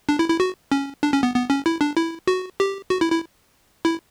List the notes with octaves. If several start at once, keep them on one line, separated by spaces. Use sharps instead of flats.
D4
E4
E4
F#4
C#4
D4
C#4
B3
B3
C#4
E4
D4
E4
F#4
G4
F#4
E4
E4
E4